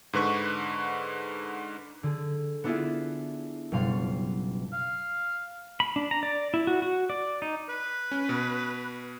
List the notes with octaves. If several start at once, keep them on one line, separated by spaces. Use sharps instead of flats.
G#2 D3 B4 C#6
D3 G#4
B3 D4 E4 F4 G#4 E5
F#1 B2 G3 F5 C6
F5
B5
D4
A#5
D5
E4
F#4
F#4
D5
D#4
B4
C#4
B2